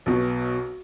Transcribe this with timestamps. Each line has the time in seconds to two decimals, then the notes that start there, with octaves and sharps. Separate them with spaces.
0.06 B1 B2